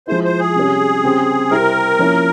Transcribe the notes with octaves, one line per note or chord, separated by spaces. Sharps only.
F3 G#3 E4 C5
C5
G#4
C3 G3 C#4
C#3 G3 C4
C3 G3 C4 E4 A#4
F3 A#3 C#4 E4